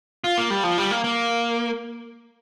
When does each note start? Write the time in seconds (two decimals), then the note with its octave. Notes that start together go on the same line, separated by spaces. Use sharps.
0.24 F4
0.38 A#3
0.50 G3
0.64 F3
0.78 G3
0.91 A#3
1.04 A#3